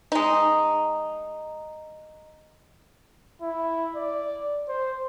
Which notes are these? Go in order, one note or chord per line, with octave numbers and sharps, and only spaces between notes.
G#3 D#4
E4
D5
C5